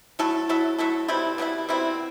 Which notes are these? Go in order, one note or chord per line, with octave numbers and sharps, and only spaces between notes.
F#3 A3 E4 A4
F#3 A3 E4 A4
F#3 A3 E4 A4
B2 G3 C4 E4
B2 G3 C4 E4
B2 G3 C4 E4